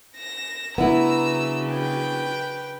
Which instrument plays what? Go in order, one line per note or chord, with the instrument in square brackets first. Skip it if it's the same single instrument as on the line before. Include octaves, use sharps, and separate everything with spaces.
[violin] A#6 E7
[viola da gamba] C#3 F#3 D4 [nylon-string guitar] B3 E4 [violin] A#5 E6
[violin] B4 G5